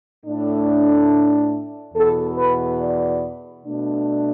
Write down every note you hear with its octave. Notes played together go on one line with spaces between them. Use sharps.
A2 A3 D4
E2 B2 B3 A4
B4
D5
B2 A3 D4